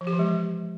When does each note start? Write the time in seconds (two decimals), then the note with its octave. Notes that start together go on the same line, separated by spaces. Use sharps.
0.01 F3
0.07 G4
0.13 E3
0.19 G#3